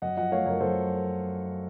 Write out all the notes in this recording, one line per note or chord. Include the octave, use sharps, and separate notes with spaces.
F#2 D#5 F#5
F3 D#5 F#5
A3 C#5 F5
F#2 A#4 C#5
F#2 A4 C5